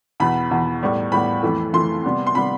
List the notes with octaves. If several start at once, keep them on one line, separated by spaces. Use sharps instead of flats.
E2 B2 B3 B5
E2 B2 B3
A2 G3 B3
A2 G3 B3 B5
F2 E3 A3
F2 E3 A3 C6
C3 G3 B3
C6
C3 G3 B3 B5